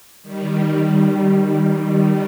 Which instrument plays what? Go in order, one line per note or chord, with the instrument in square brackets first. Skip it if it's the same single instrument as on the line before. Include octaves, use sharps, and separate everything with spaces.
[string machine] D#3 G3